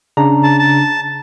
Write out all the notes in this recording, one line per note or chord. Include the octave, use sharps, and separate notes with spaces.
C#3 D4 A#5
A5
A5